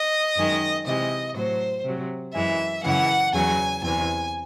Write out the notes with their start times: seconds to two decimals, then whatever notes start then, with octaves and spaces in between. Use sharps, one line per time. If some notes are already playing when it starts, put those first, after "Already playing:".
Already playing: D#5
0.36 F#2 D#3 G#3
0.85 C3 E3 G#3 D#5
1.34 A2 F#3 C5
1.84 C3 F#3
2.33 F#2 E3 G#3 E5
2.83 F#2 C#3 E3 G#3 F#5
3.33 E2 C#3 F#3 G#5
3.82 E2 C3 E3 G#5